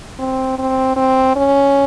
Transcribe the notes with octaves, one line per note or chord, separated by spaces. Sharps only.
C4
C4
C4
C#4